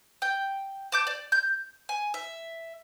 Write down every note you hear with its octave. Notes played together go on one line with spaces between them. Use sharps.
G5
A5 D6 G6
D5
G6
G#5
E5